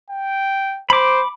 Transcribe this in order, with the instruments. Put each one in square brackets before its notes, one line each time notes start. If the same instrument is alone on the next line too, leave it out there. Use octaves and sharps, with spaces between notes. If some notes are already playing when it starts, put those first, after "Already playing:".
[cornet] G5
[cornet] C5 [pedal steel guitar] B5 D6